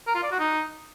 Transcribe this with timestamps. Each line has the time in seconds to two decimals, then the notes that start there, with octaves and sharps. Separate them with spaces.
0.07 A#4
0.15 F4
0.23 D5
0.31 F#4
0.39 D#4